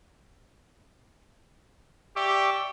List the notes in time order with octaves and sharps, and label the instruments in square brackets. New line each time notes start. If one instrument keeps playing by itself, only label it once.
[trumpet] G4 [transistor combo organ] D5 E5 C#6